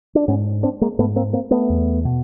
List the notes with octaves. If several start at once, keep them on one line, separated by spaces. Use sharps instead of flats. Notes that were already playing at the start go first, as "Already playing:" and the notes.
D4
G#2 B3 C#4
C4 D4
G#3 A#3
G#2 A3 B3
A#3 C4
A#3 C4
A3 B3
E2
B2